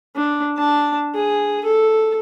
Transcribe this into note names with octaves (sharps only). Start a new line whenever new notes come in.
D4
D4 A5
G#4
A4